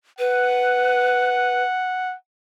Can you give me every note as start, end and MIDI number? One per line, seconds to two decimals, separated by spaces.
0.19 1.62 71
0.19 2.15 78